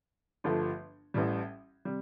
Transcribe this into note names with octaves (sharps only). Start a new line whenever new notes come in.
G1 G2 D3 F3 A3
A1 A2 G3
C3 G3